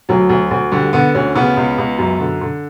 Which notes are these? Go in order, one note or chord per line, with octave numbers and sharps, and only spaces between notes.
D2 F#3
D2
D2
D3 G3
D3 B3
D2 C#4
C#3 B3
C#2
C#2
F#2
D3
D3